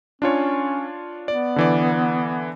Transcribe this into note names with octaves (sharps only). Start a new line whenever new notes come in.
C#4 D4 F4 C#5
B3 D5
D3 E3 D5